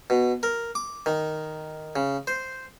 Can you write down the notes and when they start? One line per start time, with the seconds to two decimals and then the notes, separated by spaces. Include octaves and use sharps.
0.10 B2
0.43 A#4
0.75 D6
1.06 D#3
1.96 C#3
2.27 C5